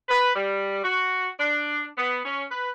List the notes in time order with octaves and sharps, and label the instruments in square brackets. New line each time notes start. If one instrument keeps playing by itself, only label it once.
[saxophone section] B4
G3
F#4
D4
B3
C#4
B4